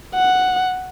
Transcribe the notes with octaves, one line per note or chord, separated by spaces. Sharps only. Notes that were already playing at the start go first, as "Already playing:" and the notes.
F#5